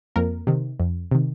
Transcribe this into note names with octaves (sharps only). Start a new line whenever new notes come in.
F2 A#3 A#4
C3 D#3
F2
C3 D#3